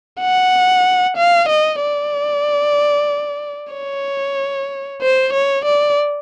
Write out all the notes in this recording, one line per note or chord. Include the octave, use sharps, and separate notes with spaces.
F#5
F5
D#5
D5
C#5
C5
C#5
D5